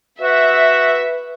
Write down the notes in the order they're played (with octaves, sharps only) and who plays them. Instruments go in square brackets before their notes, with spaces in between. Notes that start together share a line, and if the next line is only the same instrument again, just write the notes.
[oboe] F#4 [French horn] B4 [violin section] E5